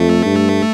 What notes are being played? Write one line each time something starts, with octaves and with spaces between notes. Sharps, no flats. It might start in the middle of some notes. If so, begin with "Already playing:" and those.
Already playing: F2 A3
G2